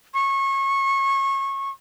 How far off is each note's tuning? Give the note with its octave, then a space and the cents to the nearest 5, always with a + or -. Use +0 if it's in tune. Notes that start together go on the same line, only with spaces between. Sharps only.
C#6 -25